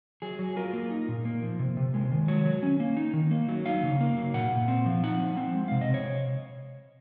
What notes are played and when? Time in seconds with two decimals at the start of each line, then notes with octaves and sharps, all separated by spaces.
0.22 F#3 G#4
0.39 F#3
0.56 F4 A#4
0.73 A#3
0.91 D#4
1.08 A#2
1.25 A#3
1.43 F3
1.59 C3
1.77 C3
1.94 G#3
2.11 D#3
2.28 F#3 C#5
2.46 F#3
2.63 C#4
2.80 A#3
2.97 D#4
3.14 D#3
3.31 A#3
3.49 F#3
3.66 D#4 F5
3.83 C#3
4.01 A#3
4.17 F#3
4.34 A#2 F#5
4.52 A#2
4.68 C4
4.86 F3
5.03 D#4 F#5
5.20 F3
5.37 C4
5.54 G#3
5.68 C3 F5
5.81 D#5
5.89 C3
5.94 C#5